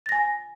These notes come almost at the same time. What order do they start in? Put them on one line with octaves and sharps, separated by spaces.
A6 A#6 G#5